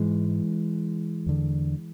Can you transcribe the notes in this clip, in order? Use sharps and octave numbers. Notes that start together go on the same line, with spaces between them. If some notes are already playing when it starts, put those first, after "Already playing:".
Already playing: G#2 E3 G#3
E2 D3